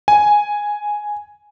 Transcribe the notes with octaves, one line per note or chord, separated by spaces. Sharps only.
G#5